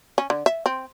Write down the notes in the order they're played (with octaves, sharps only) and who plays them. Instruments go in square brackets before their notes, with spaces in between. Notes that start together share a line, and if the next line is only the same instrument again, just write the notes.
[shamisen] C#4
D3
E5
C4